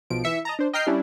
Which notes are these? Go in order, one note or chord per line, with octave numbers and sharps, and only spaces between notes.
B1 F3 D7
E3 E5 C#7
D#5 A5 A#5
D4 C5
D#5 G5 A#5 F6 G6 C7
G3 C#4 D4 E4